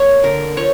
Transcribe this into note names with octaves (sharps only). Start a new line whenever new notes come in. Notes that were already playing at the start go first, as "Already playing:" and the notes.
Already playing: A#3 C#5
D3 A#4
F3 C#5